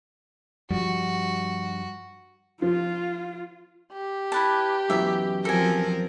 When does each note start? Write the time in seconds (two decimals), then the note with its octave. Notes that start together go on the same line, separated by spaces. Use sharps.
0.71 G2 F3 G3 F#4
2.62 F3 F4
3.93 G4
4.32 E4 B4 A5
4.90 F#2 B2 E3 E5
5.45 F3 C4 A4 A#4 G#5